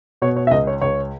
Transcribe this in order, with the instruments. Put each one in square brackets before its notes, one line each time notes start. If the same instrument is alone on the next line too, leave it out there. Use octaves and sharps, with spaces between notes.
[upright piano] B2 C#5
C#5
E5
C#2 D#5
C#5
C#2 C#5